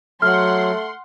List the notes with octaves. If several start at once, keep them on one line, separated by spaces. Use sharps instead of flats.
F#3 A3 F#5 C6 F6